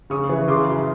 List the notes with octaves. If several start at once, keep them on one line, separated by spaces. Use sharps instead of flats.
C#3 C#6 D#6
E3
C#3 C6 D6
F#2